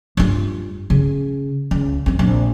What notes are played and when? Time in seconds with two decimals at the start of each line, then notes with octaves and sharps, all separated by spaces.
0.17 G2 F4
0.90 C#3
1.71 C#2
2.06 G#3 C4
2.19 A#1